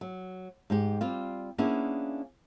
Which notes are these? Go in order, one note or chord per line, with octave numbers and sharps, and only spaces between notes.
F#3
G#2 G#3 G4
G3 C4 F4
A#3 B3 C#4 D4 E4 G#4